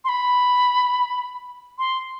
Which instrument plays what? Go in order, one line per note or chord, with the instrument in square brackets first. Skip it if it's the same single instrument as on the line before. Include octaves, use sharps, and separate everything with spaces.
[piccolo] C6
B5
C6